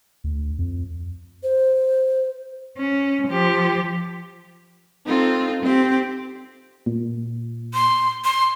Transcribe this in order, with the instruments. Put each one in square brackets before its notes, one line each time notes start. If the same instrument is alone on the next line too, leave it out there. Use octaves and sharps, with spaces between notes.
[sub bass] D2
F2
[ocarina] C5
[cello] C#4
F3 G4
[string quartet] C4 D#4 F4 A4
C4 G4
[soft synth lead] A#2
[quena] C6
C6